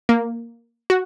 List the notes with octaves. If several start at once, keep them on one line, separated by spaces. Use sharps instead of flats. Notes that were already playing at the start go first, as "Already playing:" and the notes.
A#3
F#4